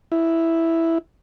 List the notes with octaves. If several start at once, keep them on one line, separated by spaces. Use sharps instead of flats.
E4